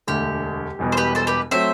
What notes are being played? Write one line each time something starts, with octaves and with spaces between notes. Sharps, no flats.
E1 D2 D3 G4
E1 E2 B2 G3
C5
G4 B4
A4 C5
G4 B4
F#3 A3 C4 C5 E5